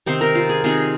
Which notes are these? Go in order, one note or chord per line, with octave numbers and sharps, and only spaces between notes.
C3 D#3 C4 D#4 C5
A#4
F4
G#4
C3 D#3 C4 D#4 G#4